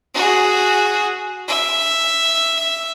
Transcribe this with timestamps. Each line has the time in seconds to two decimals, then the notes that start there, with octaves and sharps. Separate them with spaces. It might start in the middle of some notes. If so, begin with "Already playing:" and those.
0.14 F#4 G#4
1.48 E5